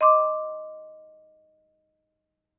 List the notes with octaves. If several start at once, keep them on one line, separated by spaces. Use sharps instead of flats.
D#5 C6 D6